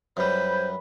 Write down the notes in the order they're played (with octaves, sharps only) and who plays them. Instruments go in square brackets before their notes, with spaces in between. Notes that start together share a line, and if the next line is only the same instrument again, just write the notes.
[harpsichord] F#2 G3 [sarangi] B4 [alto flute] C5